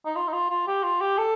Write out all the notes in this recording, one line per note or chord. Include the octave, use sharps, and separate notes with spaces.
D#4
F4
D#4
F4
F4
G4
F4
G4
A4